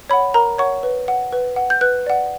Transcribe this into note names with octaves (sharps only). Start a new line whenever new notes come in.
C#5 F#5 B5
A#4 A#5
C#5 F#5 C#6
B4
F#5
B4
F#5
G6
B4 F#6
D5 F#5